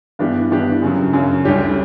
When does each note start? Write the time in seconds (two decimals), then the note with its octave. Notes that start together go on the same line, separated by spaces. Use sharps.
0.19 G2 E3 B3 D4 G4
0.51 G2 E3 B3 D4 G4
0.82 F#2 C#3 F#3
1.13 F#2 C#3 F#3
1.45 D2 D3 G3 C#4 G4